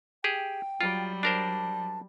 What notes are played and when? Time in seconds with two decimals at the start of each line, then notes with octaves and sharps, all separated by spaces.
0.24 G4 G#4 G5
0.81 F#3 G3 F4
1.23 D4 A#4 C5 A5